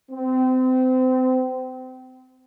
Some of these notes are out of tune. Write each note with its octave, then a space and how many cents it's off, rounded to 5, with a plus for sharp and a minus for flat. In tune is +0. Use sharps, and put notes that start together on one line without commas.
C4 -30